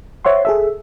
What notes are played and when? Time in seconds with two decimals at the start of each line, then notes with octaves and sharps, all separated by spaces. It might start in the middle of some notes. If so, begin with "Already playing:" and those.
0.25 C5 C#5 E5 F#5 C6
0.45 G#4 A4 E5